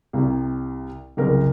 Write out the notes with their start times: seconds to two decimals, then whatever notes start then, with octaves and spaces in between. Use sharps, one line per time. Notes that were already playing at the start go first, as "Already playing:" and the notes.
0.13 C2 C3
1.17 F#1 C2 A#4